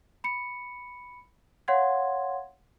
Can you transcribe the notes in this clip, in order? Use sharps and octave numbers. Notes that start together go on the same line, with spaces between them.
B5 C#7
C#5 F5 F#5 C6 G#6